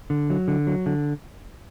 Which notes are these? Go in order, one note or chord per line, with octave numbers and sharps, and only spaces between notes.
D3
F#3
D3
F#3
D3